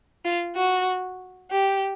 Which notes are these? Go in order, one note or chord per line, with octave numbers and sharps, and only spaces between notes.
F4
F#4
G4